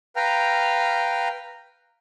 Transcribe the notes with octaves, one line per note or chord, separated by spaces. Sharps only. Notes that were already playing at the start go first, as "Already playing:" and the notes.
B4 F5 G5 A#5 F6